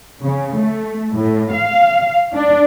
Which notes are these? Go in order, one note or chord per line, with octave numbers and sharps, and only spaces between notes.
C#3
A3
A2
F5
D4